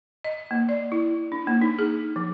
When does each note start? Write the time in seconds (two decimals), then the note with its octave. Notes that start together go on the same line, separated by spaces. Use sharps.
0.24 D#5
0.51 A#3
0.69 D5
0.92 E4
1.32 D4
1.47 A#3
1.62 D#4
1.79 G#4
2.16 F3